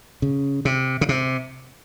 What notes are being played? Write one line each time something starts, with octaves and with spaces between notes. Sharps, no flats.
C#3
C3
C#3
C3